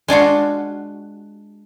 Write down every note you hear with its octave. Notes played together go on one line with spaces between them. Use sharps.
G#3 D4 F4 F#4